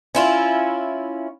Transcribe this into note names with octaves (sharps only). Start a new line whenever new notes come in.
C#4 E4 F4